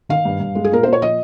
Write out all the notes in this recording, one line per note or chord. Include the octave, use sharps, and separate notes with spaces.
D#3 F5
G2
G2
G#3
G#4
A#2 A#4
A#2 C5
C#5
F3 D#5